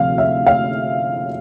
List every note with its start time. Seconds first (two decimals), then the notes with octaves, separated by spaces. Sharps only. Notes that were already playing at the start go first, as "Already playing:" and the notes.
Already playing: D2 C3 F3 F5
0.18 E5
0.47 F5